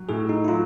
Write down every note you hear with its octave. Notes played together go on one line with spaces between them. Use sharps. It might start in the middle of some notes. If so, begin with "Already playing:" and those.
Already playing: F#3
A2 G#4
D#4
E4
F#3 F4